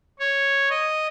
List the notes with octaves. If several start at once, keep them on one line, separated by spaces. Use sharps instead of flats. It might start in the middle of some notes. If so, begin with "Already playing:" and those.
C#5
D#5